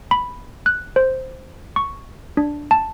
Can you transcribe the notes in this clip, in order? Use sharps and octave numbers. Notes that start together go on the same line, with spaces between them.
B5
F#6
C5
C#6
D4
A5